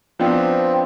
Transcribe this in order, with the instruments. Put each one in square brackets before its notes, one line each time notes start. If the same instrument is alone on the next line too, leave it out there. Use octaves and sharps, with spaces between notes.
[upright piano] F3 B3 D4 F4 [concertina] C4